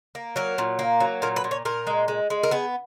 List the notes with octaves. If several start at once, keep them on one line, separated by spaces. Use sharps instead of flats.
A#3
F#3 A#4
A#2
A#3
F#3
A#2 A#4
B4
A#2
C#5
A#2 A#4
G#3
G#3
G#3
A#4
B3 G#4